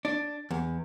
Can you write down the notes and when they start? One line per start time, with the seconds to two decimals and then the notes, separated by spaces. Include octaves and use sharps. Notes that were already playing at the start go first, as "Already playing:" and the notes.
0.05 D4
0.51 E2